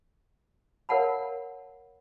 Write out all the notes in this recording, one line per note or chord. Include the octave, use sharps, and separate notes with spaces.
A#4 C#5 F5 F#5 A5 B5